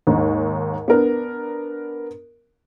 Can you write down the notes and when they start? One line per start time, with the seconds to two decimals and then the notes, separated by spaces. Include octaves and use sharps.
0.07 D#2 G#2
0.88 B3 D4 A#4